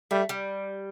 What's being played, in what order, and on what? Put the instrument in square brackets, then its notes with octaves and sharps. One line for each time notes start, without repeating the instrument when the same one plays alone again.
[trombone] G3 [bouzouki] A3
[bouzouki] G3